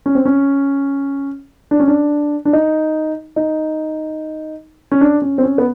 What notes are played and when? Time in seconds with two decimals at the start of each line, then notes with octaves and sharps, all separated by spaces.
0.06 C#4
0.15 C4
0.25 C#4
1.71 D4
1.80 C#4
1.88 D4
2.45 D4
2.53 D#4
3.36 D#4
4.92 C#4
5.01 D4
5.22 C#4
5.38 C4
5.43 C#4
5.58 B3